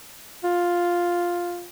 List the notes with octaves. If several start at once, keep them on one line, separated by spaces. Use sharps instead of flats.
F4